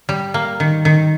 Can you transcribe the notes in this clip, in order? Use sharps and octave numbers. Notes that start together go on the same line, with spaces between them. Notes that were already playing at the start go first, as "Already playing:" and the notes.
G3
A#3
D#3
D#3